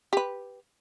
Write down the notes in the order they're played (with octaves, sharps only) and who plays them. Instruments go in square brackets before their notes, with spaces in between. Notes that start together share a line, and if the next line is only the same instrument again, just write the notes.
[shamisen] G4 B4